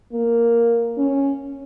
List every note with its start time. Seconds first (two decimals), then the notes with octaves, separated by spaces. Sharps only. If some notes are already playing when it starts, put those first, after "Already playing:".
0.12 A#3
0.98 C#4